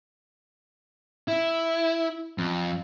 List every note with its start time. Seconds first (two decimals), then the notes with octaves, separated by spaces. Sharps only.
1.28 E4
2.38 F2